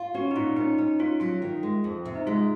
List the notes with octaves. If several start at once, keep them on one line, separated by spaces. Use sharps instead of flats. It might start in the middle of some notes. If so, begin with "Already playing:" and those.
Already playing: F4
C#4 F#4
D#4
A#2 F4
C#4 D#4
C#4 D#4
C#4 F4
F#3 F4
D#3
G#3
F2
C3
D#4
G#3 F4